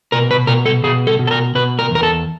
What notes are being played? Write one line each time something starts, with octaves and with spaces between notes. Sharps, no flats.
B2 A#4
B4
B2 A#4
A4
B2 G#4
A4
B2
A4
A#4
B2 B4
A#4
E2 A#4
A4